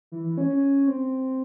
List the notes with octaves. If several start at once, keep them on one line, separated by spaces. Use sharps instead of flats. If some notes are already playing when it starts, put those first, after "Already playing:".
E3
E3
C#4
C#4
C4